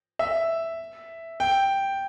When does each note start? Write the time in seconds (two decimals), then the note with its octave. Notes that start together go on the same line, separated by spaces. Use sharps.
0.19 E5
1.40 G5